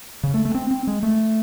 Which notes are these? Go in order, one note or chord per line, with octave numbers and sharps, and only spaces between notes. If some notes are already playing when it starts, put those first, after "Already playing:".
C#3
A3
A3
C4
C4
G#3
A3